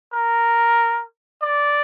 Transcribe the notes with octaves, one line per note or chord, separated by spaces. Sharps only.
A#4
D5